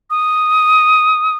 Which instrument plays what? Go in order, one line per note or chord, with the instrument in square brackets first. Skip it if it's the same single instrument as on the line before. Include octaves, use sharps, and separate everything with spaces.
[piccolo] D#6